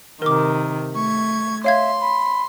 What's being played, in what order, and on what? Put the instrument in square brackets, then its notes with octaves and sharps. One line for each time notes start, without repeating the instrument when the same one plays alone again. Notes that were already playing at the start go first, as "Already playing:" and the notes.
[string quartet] C3 D#3 [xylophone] A#4 D6
[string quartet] A3 G#6 [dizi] C#6
[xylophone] C#5 F5 G#6 [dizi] E5 [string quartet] C6
[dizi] B5